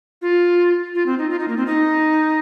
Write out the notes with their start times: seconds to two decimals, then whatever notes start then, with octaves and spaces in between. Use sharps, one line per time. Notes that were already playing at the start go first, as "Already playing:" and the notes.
0.22 F4
0.95 F4
1.06 C4
1.18 D#4
1.30 F4
1.39 D#4
1.48 A#3
1.57 C4
1.66 D#4